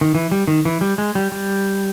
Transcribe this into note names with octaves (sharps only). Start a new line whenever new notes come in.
D#3
E3
G3
D#3
E3
G3
G#3
G3
G3